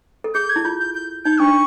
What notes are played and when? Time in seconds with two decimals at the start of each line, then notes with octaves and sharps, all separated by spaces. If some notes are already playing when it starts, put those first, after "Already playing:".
0.24 A4
0.34 G#4 G6
0.50 G#6
0.56 E4
0.65 F4 G6
0.79 G6
0.95 G6
1.25 D#4 G6
1.40 D4 C#6